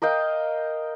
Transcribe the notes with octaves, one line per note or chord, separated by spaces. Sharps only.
A#4 D#5 F5 G5